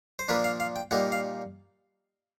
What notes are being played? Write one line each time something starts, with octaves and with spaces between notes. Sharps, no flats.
C5
A#2 F3 A#3 D4 B4
F5
F5
G5
A#2 G3 A#3 D#4 F#5
F5